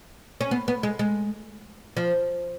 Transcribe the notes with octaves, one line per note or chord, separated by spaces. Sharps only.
C#4
B3
B3
G#3
G#3
F3